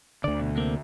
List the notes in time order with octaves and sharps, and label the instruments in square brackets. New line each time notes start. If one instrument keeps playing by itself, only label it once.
[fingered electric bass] D2 D3 [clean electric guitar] D5
[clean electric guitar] B2
C3 A#3 C4